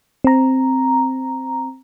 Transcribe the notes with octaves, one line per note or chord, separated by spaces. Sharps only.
C4 A#5